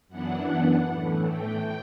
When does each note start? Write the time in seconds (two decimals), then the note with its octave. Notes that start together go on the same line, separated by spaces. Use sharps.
0.08 F#2 E3 B3 D4 F#5
0.87 A2 E3 A3
1.27 G5